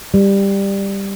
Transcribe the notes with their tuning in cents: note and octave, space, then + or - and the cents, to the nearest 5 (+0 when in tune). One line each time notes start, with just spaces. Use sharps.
G3 +10